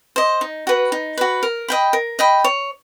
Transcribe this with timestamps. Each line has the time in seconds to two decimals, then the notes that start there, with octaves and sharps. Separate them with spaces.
0.16 C5 D#5
0.41 D#4
0.67 F#4 B4
0.92 D#4
1.18 F#4 B4
1.43 A#4
1.68 D#5 G5 B5
1.93 A#4
2.19 D#5 G5 B5
2.44 C#5